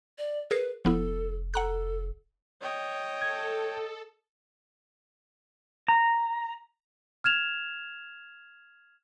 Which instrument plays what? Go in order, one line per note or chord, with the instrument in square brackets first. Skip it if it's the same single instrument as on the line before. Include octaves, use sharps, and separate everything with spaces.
[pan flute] D5
[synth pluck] G#4 A#4 C7 [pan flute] B4
[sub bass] F1 [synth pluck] F3 B3 E4 [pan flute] A4
[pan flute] A4 [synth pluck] F#5 A#5 F#6
[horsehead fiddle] C#5 G5 [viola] D#5
[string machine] A4 [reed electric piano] G#6
[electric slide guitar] A#5
[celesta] F6 G#6 E7 F7